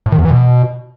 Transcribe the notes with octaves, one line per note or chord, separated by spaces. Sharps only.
A2
D#3
E2
E3
B2